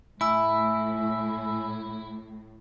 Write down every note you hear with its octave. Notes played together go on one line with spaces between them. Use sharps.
A2 E4 G#5 E6